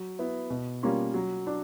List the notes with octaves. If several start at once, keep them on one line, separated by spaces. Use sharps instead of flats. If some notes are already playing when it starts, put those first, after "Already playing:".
Already playing: F#3
B3 E4
B2
G3 A#3 C#4 F4
F#3
D4